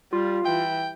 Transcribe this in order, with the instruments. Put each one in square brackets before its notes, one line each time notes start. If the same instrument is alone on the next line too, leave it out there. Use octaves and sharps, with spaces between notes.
[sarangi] G3 [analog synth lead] F4
[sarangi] E3 [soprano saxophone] G5